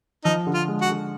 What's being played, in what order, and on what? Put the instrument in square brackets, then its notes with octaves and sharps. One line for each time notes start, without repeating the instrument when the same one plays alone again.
[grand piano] F3 [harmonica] D#4
[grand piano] D3
[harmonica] F4
[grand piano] G#3
[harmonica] F#4
[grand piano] D3